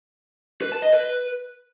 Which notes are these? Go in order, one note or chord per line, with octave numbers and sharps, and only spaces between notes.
B4
A5
D#5
B4